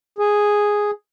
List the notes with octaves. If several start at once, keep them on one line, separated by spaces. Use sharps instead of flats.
G#4